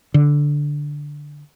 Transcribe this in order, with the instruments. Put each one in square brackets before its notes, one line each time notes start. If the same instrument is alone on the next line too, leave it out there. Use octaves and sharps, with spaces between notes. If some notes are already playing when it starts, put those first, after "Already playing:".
[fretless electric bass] D3